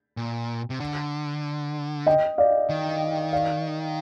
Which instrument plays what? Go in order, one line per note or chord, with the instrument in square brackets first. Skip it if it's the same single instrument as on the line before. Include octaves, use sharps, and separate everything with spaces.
[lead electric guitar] A#2
C3
D3
[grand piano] D#5 G5
D5 F5
[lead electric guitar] D#3
[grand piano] D5 F5